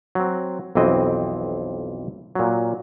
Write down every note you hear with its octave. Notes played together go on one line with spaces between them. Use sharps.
F#3 C4
B1 F2 E3 C4 D#5
A#2 F#3